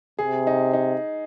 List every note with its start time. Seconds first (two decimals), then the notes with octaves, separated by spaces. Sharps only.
0.19 C3 G#4
0.47 D#4
0.73 D#4